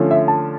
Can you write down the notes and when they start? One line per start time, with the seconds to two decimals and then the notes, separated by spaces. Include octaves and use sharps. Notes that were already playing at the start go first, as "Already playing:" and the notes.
Already playing: D3 F3 A3 C#4
0.11 E5
0.28 A5